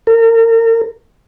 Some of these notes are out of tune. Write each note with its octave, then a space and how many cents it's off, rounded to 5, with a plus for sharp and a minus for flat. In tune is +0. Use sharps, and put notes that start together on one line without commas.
A#4 -35